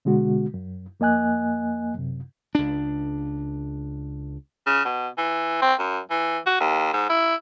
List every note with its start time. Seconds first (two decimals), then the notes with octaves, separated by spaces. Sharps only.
0.05 B2 D3 G#3 F#4
0.54 F#2
1.00 F2 A#3 D#5 G#5 F#6
1.95 F#2 C3
2.55 C#2 D4
4.67 C#3
4.85 B2
5.18 E3
5.61 C4
5.79 F#2
6.10 E3
6.46 F#4
6.60 D#2
6.93 G#2
7.10 E4